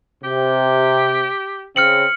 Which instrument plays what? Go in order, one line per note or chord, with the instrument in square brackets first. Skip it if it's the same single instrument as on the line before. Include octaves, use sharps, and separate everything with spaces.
[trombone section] C3 [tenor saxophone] G4
[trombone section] C#3 [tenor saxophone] C4 [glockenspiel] F6 C#7 F#7